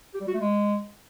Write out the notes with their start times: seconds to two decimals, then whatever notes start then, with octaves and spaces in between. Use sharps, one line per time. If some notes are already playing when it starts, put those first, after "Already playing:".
0.14 G4
0.21 G3
0.27 F#4
0.34 A3
0.41 G#3